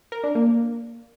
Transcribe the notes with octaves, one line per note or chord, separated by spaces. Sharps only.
A#4
D4
A#3